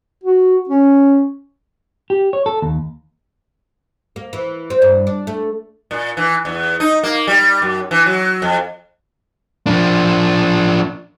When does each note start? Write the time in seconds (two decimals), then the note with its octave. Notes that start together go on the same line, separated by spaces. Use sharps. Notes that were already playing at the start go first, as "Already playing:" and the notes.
0.24 F#4
0.69 C#4
2.10 G4
2.33 C#5
2.46 A4
2.62 D#2
4.16 A#3
4.33 E3
4.70 C4
4.82 G2
5.07 D4
5.27 A3
5.91 A#2
6.17 E3
6.45 E2
6.80 D#4
7.03 A#3
7.27 G3
7.62 F#2
7.91 E3
8.06 F#3
8.42 F2
9.66 F3 D4